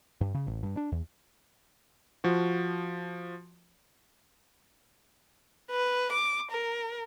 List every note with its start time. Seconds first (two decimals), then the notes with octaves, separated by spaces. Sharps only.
0.21 G2
0.34 C#3
0.47 A1
0.63 G2
0.77 D4
0.92 E2
2.24 F3 F#4
5.71 B4
6.12 D6
6.51 A#4